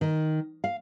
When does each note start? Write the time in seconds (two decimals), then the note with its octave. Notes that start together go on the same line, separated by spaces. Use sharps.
0.01 D#3
0.64 F5